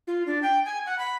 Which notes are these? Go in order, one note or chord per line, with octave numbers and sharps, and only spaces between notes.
F4
D4
G5
G#5
F#5
B5